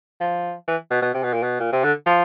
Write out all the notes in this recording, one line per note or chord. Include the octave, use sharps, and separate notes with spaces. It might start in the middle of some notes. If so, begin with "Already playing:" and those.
F3
E3
B2
B2
C3
B2
A#2
B2
A#2
C3
D3
F3